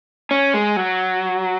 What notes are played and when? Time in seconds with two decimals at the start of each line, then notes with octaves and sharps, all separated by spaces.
0.31 C#4
0.54 G#3
0.77 F#3